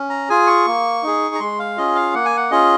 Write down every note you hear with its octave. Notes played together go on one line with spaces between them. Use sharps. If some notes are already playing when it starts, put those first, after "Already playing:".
Already playing: C#4
A#5
F4 G#4 G#5
C#6
A#3
D#4 G#4
A#5
G#3 C6
F5
C#4 F4 G#4 D#5
F5
A#3 F#5
G#5
F#5
C#4 F4 G#4 D#5